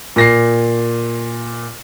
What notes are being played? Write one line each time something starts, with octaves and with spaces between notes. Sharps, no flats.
A#2 A#6 C7